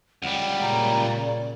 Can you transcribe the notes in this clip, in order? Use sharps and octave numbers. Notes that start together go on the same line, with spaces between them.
C#2 G3 F#5
A#2 C#3 A#5
D5